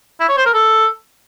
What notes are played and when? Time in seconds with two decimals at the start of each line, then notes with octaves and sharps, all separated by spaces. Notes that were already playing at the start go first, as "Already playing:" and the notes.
0.20 E4
0.29 C#5
0.37 C5
0.46 A#4
0.54 A4